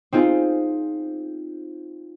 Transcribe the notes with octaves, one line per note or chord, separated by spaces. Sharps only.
C4 D#4 F4 G#4